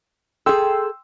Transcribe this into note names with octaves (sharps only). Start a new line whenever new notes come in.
G#4 A4 G5 C6 E6